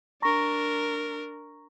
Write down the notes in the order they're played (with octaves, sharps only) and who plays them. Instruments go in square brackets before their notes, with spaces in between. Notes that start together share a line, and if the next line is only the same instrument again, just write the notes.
[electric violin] D4 A#4 [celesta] A#5 C#6 A#6